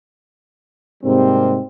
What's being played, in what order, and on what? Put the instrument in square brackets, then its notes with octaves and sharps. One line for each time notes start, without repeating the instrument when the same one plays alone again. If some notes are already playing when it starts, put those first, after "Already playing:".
[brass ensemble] G#2 C3 G3 A#3 C4